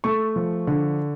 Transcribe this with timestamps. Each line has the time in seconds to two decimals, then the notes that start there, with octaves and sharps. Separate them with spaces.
0.04 A3 C#6
0.36 F3
0.67 D3